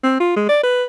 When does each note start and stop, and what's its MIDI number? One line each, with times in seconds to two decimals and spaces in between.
0.03 0.17 60
0.20 0.36 65
0.36 0.47 56
0.49 0.61 74
0.63 0.85 71